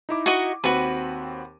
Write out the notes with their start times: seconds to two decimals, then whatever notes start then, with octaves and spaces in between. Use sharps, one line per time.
0.09 D#4 E4 D6
0.26 F#4 D#5 C#6
0.64 D#2 C4 F#4 B4 D#7